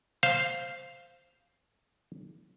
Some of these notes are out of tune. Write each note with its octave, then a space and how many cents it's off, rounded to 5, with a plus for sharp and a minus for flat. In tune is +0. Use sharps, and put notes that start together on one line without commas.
C5 +0 F5 -5